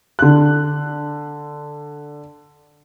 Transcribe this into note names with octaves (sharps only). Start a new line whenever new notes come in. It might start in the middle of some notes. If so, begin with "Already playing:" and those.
D3 F#6